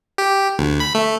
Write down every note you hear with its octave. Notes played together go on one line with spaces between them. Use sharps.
G4
D2
B5
A3